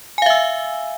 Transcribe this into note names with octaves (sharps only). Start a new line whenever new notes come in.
E5 F5 G#5 E6